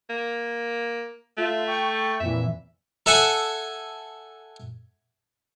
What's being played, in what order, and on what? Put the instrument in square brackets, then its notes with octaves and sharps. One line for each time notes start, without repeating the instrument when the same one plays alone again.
[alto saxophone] A#3
[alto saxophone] A3 [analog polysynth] F4 E5
[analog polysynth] G5 C#6
[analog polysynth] F2 A#2 E3 [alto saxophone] E5
[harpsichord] A4 E5 F#5 G#5